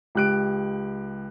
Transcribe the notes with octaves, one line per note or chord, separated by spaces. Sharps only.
C#2 G4 F#6 D7